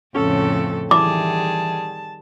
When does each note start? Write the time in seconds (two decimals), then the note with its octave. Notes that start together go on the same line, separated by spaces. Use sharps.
0.15 F2 A2 C#3 C#4 A4
0.91 D#3 E3 G3 G#4 A5 D6